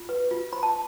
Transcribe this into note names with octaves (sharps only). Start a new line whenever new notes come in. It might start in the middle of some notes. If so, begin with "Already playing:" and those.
Already playing: F4
B4
F4
C5 B5
A5